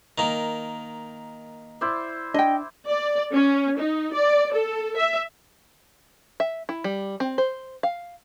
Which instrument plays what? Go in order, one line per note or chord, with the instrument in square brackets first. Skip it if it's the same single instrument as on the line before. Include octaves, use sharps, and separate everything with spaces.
[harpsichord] D#3 A#3
[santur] E4 C5 D5
[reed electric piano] D4 [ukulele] D#5 G5
[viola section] D5
C#4
D#4
D5
A4
E5
[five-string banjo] E5
E4
G3
C4
C5
F5